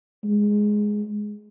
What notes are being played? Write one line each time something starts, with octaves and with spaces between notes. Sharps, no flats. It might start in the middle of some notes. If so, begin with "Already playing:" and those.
G#3